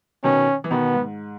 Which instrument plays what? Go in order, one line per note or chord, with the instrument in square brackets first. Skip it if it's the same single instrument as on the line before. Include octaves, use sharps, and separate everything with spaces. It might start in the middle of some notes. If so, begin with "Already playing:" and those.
[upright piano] B2 D#3 [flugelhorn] C#4
[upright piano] E3
[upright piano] B2 D#3 [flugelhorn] B3
[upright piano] G#2